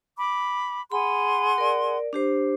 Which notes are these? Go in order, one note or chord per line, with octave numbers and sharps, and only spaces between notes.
B5 D6
G#4 F#5 B5 C6
A#4 D5
D4 G4 C5